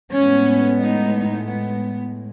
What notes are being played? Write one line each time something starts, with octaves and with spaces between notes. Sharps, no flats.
A2 G#3 B3 C#4
D#4
B3